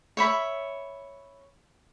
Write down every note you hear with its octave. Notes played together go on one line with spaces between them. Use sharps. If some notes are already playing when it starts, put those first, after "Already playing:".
C#5 E5 B5